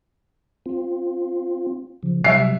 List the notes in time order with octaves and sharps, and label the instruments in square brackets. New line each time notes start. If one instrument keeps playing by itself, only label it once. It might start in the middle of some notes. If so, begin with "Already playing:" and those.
[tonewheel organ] C4 F4
C#3 F3
[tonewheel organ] C3 F#3 G3 [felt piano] E5 C7